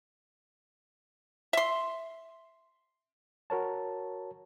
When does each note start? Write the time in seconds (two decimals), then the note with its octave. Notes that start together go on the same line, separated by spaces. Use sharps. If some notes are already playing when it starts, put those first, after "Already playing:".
1.53 E5 C6
3.50 F#4 A#4 C#5 A5